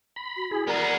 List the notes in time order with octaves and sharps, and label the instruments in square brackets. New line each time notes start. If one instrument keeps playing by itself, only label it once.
[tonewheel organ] B5
[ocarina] F#4
[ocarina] E4 [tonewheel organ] G#4
[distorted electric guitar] B3 G#4 [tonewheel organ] A#4 [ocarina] D5